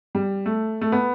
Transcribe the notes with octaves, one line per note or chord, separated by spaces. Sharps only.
G3
A3
A3
B3